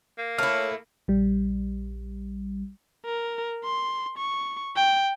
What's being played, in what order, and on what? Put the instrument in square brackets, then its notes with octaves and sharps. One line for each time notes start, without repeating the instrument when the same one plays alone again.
[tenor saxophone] A#3
[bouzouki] A3 E4 [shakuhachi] C#5 [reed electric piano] F6
[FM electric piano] A#1 G3
[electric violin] A#4
C6
C#6
G5